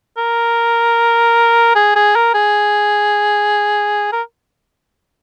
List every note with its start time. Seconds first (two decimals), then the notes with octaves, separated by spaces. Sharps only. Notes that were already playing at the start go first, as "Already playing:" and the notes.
0.18 A#4
1.75 G#4
1.96 G#4
2.16 A#4
2.34 G#4
4.12 A#4